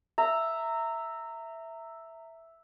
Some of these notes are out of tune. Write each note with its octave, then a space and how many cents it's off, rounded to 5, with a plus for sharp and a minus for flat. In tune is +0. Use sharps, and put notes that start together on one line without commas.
E5 +0 A#5 -20